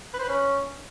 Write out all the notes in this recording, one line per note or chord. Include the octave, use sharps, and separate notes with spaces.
B4
C5
B4
C#4